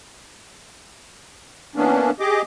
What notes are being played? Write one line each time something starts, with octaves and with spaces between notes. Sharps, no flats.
E3 A#3 B3 C#4 D4
G4 G#4 D#5 D6